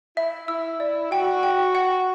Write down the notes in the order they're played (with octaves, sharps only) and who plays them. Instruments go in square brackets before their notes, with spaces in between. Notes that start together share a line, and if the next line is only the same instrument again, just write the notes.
[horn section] E4 [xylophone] E5
[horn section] E4 [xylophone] E6
[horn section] E4 [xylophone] D5
[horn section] F#4 [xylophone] G5
[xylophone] G5
F#5